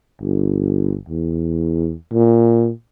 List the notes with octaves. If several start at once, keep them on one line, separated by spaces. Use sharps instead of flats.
G1
E2
A#2